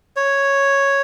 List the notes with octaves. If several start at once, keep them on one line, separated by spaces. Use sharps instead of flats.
C#5